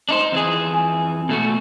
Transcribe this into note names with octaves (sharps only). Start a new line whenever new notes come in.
D4 D#4 C5
F2 E3 G#4
G#5
B2 A3 F#4